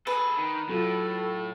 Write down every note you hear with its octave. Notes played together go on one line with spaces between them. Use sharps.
G#4 A4 B4
D#3
A2 F#3 F4 A4